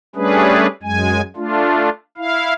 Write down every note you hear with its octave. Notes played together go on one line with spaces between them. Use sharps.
G3 A3 C#4 D4 G#4 B4
F#2 G#3 G#5
A3 D4 F4
E4 F5